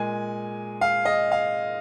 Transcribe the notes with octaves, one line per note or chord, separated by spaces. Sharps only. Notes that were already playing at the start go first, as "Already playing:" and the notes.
Already playing: A#2 G#3 G#5
F5
D#5
F5